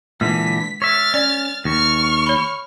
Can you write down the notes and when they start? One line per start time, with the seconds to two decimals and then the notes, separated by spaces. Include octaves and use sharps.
0.21 A#2 D3 E3 G#3 B6
0.82 C#5 E5 F6 A6
1.14 C#4 D5
1.65 D#2 C#6 F6
2.27 C#5 B5